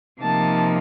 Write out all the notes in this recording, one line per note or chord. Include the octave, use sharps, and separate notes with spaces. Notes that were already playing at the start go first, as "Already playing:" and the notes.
C3 F3 A#3 D#4 A5